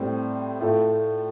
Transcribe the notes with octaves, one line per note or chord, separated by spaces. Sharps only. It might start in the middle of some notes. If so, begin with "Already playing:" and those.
Already playing: A2 G3 C4
A2 A3 F4